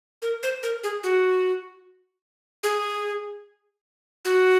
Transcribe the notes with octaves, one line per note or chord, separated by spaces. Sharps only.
A#4
C5
A#4
G#4
F#4
G#4
F#4